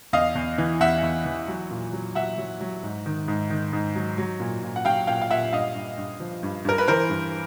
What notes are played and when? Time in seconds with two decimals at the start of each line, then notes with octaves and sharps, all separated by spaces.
0.13 E2 D#5 F5
0.35 E2
0.58 E3
0.80 E2 E5 F#5
1.03 E2
1.25 E3
1.48 F#3
1.70 A#2
1.93 F#3
2.15 F#3 E5 F#5
2.38 F#3
2.61 F#3
2.83 G#2
3.06 D#3
3.28 G#2
3.50 D#3
3.73 G#2
3.95 F#3
4.18 F#3
4.40 A#2
4.63 A#2
4.76 F#5
4.85 F#3 F5 G5
5.07 A#2 F5 G5
5.22 F5
5.30 A#2 E5 F#5
5.53 G2 D#5 F5
5.75 G2
5.98 G2
6.20 F3
6.43 G2
6.65 G2 A#4
6.78 B4
6.88 E3 A#4 C5
7.10 G2